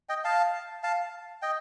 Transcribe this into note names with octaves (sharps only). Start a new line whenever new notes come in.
D#5 G5
F5 A5
F5 A5
D#5 G5